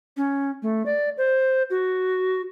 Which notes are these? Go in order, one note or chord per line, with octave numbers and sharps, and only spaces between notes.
C#4
A3
D5
C5
F#4